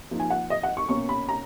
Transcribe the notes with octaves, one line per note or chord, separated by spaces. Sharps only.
F3 A#3 D#4
G#5
F#5
D#5
F#5
C#6
B2 A#3 C#4 C#6
B5
A#5